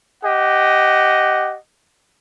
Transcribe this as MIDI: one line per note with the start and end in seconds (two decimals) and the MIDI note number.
0.24 1.57 67
0.24 1.57 75
0.24 1.57 78